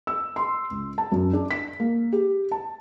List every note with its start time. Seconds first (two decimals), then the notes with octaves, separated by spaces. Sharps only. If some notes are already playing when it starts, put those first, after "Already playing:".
0.07 E6
0.36 C6
0.71 C#2
0.98 A5
1.12 F#2
1.33 D4
1.51 B6
1.80 A#3
2.13 G4
2.51 A5